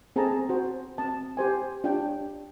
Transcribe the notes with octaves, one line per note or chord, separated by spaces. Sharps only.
C4 G#4 A4 A5 A#5
F#4 C5
C4 A5
G4 C5 G#5
D4 F4 G4 C#5 G5